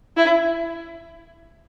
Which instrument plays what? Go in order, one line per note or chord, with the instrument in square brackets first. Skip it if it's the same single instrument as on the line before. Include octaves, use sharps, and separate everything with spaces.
[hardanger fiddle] E4